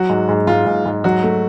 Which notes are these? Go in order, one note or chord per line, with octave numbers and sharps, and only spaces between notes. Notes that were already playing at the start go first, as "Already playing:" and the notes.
Already playing: F#3 F#4
G#2
G#2
G#2 F4
G#2
G#2
F#3 F#4
A3